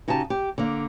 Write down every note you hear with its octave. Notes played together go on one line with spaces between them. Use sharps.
C#3 D#4 F#4 G4 A5
G4
D3 A#3